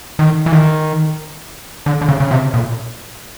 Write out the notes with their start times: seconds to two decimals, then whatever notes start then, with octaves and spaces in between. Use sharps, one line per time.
0.19 D#3
0.46 E3
0.52 D#3
1.86 D3
2.01 D3
2.09 C#3
2.20 C#3
2.31 C3
2.54 A#2